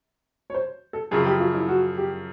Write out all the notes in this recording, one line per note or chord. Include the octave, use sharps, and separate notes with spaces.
C#5
C5
A4
F#2 C#3 F3 G#4
G4
F4
E4
F#4
G4